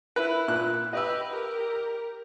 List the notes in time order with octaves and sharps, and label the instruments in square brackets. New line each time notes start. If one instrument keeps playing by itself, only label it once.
[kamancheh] E4 [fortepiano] B4
[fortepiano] A#2 F#6
[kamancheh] G4 B4 [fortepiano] D#5 E6
[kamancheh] G4 A#4